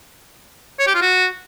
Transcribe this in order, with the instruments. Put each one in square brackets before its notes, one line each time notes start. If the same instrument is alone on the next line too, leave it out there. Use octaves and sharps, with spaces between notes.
[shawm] C#5
G4
F4
F#4